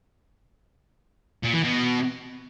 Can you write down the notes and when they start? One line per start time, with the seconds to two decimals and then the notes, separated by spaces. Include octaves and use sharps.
1.43 A#2
1.53 E3
1.63 B2